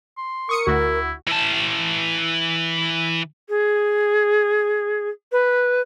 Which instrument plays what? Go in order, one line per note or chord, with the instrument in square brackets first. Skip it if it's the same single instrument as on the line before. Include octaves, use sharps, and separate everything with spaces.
[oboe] C6
[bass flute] A#4 [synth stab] C#6 D#6 C#7
[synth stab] D2 F#4 [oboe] E4
[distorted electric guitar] E3 A5
[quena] G#4
B4